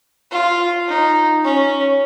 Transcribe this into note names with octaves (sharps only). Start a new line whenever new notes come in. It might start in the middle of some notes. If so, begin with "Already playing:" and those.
F4
D#4
C#4